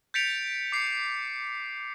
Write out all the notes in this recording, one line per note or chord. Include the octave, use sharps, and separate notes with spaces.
G6 A6 B6 C#7 D7 F7
D6 C7 C#7